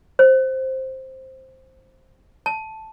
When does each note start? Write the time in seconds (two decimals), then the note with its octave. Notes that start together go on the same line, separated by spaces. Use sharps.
0.19 C5
2.46 A5